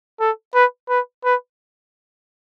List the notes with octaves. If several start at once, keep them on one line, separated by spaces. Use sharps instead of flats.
A4
B4
B4
B4